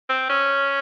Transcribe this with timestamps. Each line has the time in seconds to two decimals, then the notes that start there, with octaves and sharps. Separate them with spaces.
0.10 C4
0.29 C#4